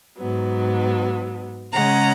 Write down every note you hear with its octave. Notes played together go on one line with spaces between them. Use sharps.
G#2 F#3 B3
C#3 G#3 C#4 F#5 A#5